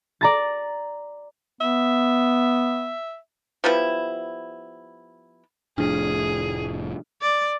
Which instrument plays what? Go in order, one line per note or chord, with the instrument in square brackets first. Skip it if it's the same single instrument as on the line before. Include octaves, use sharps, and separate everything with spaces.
[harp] D5 A#5 A6
[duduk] B3 [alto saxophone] E5
[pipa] F3 G3 B3 E4
[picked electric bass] F1 A2 F3 [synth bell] D4 [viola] G#4
[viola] D5